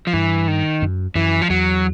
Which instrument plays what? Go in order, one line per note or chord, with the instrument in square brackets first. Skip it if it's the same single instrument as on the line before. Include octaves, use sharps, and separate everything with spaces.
[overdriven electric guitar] F3
[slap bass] G2 [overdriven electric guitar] E3
[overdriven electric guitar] D#3
[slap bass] F#2
[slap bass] F#2 [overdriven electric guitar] E3
[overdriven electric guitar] F3
[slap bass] E2 [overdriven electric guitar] F#3